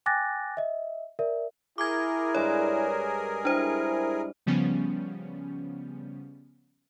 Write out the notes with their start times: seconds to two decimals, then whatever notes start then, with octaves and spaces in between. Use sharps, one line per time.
0.06 G5 G#5 D6 F#6 A6 A#6
0.57 D#5 E5
1.19 A#4 D5 E5
1.78 E4 G#4 A#4 D6 G#6
2.35 G2 G#3 C#5 D5
3.45 D4 E4 C5
4.46 C#3 F3 G3 B3 C#4